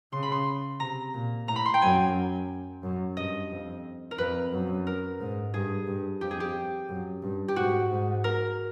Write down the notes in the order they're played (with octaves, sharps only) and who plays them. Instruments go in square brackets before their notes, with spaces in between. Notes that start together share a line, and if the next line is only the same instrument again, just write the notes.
[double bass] C#3 [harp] C6
[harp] B5
C6
[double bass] C3 [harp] A#5
[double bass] A#2
[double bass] A2 [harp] A#5
[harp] B5
C6
G5
[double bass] F#2 [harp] G#5
[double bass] F#2
[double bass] G2 [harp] D#5
[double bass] F2
[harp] A#4
[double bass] F2 [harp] B4
[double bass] F#2
[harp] A#4
[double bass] G#2
[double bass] G2 [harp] G#4
[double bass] G2
[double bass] F2 [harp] G4
[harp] G#4
G4
[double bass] F#2
G2
[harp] G4
[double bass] G#2 [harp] F#4
[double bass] G#2
[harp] A#4